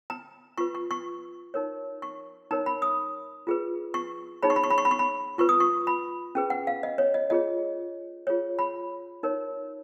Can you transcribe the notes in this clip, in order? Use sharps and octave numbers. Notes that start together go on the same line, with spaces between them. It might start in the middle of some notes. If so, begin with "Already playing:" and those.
A#5
F4 B4 C#6
C#6
C#6
D#4 A#4 C#5
C#6
D#4 A#4 C#5 A#5
B5
D#6
F4 G#4 B4
C#6
D#4 G#4 C#5 B5
C#6
B5
C#6
B5
C#6
B5
C#6
B5
F4 B4 C#6
D#6
C#6
B5
C#4 G#4 B4
F#5
F5
D#5
C#5
D#5
F4 G#4 C#5 D#5
F4 G#4 C#5
B5
D#4 A#4 C#5